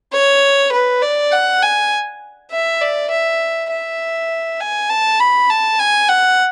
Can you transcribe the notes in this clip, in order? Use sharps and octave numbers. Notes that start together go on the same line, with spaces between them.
C#5
B4
D5
F#5
G#5
E5
D5
E5
E5
G#5
A5
B5
A5
G#5
F#5